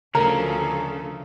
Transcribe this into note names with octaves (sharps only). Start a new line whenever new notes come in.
D2 C#3 F3 A4 A#4